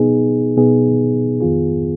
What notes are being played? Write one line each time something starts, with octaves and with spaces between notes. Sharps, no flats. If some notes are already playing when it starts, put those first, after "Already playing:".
Already playing: B2 B3 D#4 G#4
B2 B3 D#4 G#4
F2 D#3 B3 F4 G#4